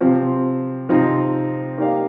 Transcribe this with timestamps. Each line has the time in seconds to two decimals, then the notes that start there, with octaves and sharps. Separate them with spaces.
0.01 C3 F3 C4
0.89 C3 F3 C4 D#4
1.78 A#3 D#4 G4 D5 F5